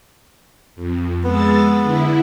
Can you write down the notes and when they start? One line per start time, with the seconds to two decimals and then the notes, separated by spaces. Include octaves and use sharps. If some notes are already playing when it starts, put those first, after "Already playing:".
0.76 F2
1.24 G#3 B3 E6 A6
1.82 D3 E4